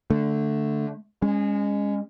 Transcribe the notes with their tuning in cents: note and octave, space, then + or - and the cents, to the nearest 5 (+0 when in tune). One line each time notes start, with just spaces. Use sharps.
D3 +0 A3 +0
G#3 -25 C#4 +5